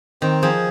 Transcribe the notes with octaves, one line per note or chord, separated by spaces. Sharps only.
D#3 C4
F3 G#4